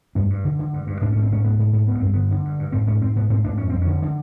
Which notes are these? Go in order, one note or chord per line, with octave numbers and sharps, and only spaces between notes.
G2 D4
G2
D3
D3
G2
G2
G#2 D4
G#2 C#4
C4
G#2 C#4
G#2 B3
G#2
G#2
G2 B3
G2 C4
D3 B3
D3
G2
G2
G#2 C4
G#2 C#4
G#2 C4
G#2 B3
G#2 C4
G#2 D4
F2 C#4
F2 C4
D3 C#4
D3